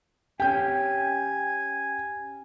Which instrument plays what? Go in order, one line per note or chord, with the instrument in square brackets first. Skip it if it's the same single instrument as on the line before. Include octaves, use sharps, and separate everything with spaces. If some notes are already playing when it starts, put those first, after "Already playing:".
[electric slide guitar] C#4 G4 [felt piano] G5 G6 [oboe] G#5